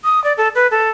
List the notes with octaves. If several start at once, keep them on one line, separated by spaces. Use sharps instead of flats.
D#6
D5
A4
B4
A4